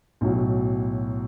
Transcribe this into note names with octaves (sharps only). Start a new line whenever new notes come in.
B1 A2 F#3